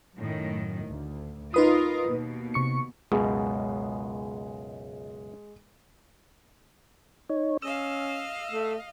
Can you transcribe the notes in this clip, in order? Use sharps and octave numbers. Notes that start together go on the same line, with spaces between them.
F#2 A2 D#3
D2
D#4 F4 A#4 B4 D#6
D#2 B2
C3 C#6 C#7
C#2 F#2 B2 G#3
D#4 C#5
C#4 D#5 F5 E6
A3